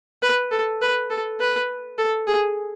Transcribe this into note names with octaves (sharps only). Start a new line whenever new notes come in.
B4
A4
B4
A4
B4
A4
G#4